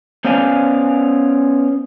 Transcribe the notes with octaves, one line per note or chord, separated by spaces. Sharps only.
B3 C#4 C5 D5 F5 G#5